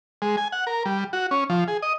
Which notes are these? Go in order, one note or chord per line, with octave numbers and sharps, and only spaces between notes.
G#3
G#5
F#5
A#4
G3
F#4
C#4
F3
G#4
D#5